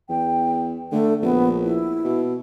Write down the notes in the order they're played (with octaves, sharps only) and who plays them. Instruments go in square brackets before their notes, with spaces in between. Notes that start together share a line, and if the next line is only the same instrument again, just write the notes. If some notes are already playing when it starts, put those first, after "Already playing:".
[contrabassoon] E2 [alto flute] G5
[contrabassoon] D3 [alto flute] A3
[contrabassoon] A#1 [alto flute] B3
[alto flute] E4
[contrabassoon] B2